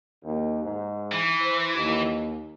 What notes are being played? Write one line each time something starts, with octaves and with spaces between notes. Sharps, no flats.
D#2
G#2
E3
C5
D#2